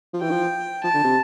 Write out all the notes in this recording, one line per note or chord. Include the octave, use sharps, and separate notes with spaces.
F3
E3 G5
F3
F3 A5
D3
C3